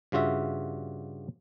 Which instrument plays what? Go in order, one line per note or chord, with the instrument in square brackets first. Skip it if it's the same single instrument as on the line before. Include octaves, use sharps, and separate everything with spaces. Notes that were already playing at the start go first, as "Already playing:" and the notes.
[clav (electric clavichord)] G2 C#3 F4 F#4 E5